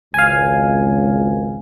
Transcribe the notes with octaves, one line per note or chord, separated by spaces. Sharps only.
G#1 C#2 F5 G#5